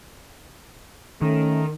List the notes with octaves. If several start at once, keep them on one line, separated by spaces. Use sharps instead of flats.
D#3 A3 C#4 A4